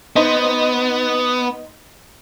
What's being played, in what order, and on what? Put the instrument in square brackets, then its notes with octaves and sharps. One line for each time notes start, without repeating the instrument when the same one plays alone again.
[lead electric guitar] B3 [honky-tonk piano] D#4 C5 D#5